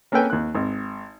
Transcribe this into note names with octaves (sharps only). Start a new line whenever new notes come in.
A#3 C#4 A4 B4 G5 G#5
D#2 F#6
G#1